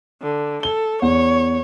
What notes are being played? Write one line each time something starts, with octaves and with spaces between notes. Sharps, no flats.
D3
A4 G7
E2 C#5